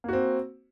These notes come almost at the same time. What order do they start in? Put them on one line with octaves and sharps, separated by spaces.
A#3 F#4 C4